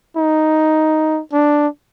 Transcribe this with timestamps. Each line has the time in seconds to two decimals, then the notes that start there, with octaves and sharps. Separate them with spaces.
0.17 D#4
1.33 D4